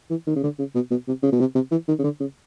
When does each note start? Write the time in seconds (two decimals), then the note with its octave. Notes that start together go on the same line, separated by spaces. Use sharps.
0.10 E3
0.27 D#3
0.36 C#3
0.43 D3
0.59 C#3
0.75 B2
0.90 B2
1.08 C3
1.22 C#3
1.32 B2
1.40 C3
1.55 C3
1.71 E3
1.88 D#3
1.99 C#3
2.04 D3
2.20 C#3